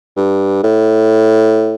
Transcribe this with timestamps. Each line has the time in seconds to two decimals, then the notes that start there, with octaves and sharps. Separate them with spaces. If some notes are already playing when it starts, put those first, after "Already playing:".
0.17 G2
0.63 A2